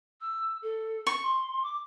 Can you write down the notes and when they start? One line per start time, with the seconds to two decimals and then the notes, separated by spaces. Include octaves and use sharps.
0.21 E6
0.62 A4
1.07 C#6
1.23 C6
1.63 D6